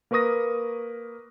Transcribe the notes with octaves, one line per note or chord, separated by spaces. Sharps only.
A#3 A#4 B4 C#6 D#6 A#6